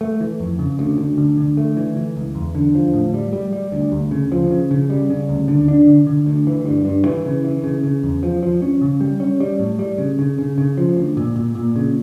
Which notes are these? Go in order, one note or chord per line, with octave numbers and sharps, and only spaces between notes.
A3
E3
F2
C#3
D2
D2
D3
D3
A3
E3
E3
C#2
E2
D3
F3
A2
G3
G3
G3
D2
D2
C#3
F3
C#3
C#3
G3
C#3
D2
D3
D4
D3
D3
D2
E3
G2
G2
E3
C#3
E3
C#3
C#3
E2
F3
F3
C#4
C#3
G3
C#4
G3
A2
G3
C#3
C#3
C#3
C#3
F3
D2
A#2
A#2
A#2
C#3